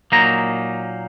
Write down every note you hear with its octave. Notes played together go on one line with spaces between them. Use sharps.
A#2 F#3 A#3 D#4 A#5